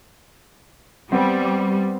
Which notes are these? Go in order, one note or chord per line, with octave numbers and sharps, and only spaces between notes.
G3 B3 C4